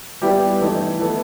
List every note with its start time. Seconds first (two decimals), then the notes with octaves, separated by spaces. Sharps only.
0.22 G3 B3 E4 G4
0.61 E3 A3 D#4
0.99 E3 B3 E4 A4